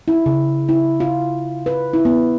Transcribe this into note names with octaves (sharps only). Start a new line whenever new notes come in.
E4
C#3
E4
F4
B4
E4
B3